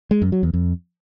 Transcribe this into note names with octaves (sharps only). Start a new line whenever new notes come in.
G#3
F#2
F#3
E2
F2